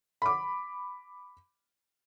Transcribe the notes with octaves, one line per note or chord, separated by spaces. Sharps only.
B5 D6